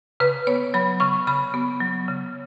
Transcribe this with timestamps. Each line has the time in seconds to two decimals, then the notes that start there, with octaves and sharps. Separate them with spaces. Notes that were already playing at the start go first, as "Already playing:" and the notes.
0.20 C#3 B4
0.47 B3 C#5
0.74 F#3 B5
1.00 C#3 C#6
1.27 C#3 B5
1.54 B3
1.80 F#3
2.08 C#3